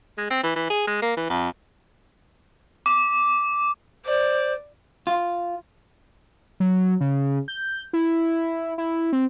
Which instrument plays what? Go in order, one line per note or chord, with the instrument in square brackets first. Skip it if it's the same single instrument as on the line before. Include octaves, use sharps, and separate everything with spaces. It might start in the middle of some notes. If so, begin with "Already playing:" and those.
[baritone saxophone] G#3
C4
E3
E3
G#4
G#3
A#3
E3
F2
[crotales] D6
[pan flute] C5 [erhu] D5
[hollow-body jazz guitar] F4
[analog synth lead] F#3
C#3
G6
E4
E4
C4